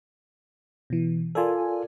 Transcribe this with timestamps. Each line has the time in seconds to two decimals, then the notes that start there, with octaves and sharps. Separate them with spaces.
0.90 B2 E3
1.35 F4 A4 A#4 D5 G#5